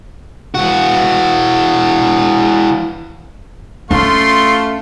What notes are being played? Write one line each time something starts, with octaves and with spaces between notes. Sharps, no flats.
E3 F#4
A3 C#4 F4 C6